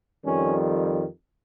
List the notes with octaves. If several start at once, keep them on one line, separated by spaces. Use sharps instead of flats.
F2 D#3 G3 C#4